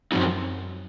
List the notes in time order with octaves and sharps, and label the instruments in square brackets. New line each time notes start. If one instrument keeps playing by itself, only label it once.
[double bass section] F#2 [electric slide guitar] F3 C4 D#4 F#4